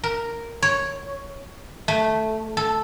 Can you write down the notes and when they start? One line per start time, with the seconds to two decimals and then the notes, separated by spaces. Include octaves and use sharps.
0.03 A#4
0.62 C#5
1.88 A3
2.57 A4